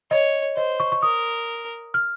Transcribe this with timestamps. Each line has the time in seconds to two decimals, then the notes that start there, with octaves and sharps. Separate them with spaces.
0.11 C#5 D#5
0.57 C5 D#5
0.80 C#6
0.92 C#6
1.02 A#4 D#6
1.94 F6